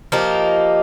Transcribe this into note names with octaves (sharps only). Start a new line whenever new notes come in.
F3 A#3 D#4 G4